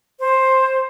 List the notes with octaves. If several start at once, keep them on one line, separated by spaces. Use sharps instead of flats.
C5